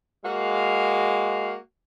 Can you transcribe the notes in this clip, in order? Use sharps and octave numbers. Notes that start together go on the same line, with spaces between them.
G#3 A#3 F#4 F5